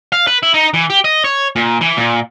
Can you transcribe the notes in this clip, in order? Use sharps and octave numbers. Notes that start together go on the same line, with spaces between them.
F5
B4
E4
D#4
E3
G4
D#5
C#5
A#2
E3
A#2